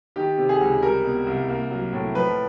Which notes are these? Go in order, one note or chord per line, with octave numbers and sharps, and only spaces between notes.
D#3 G4
C3
G#4
C#2
G3 A#4
B2
C2
A#3
F#3
A2
F3 B4